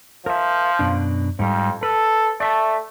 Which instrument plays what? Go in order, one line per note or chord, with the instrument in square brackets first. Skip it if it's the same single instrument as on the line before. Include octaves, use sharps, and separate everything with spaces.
[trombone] F3 [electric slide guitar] A#4 E5
[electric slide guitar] F#2 B2 D4
[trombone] F2 [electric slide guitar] G#2 G3
[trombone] A4 [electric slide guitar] B4
[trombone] A3 [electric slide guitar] D5 E5 A5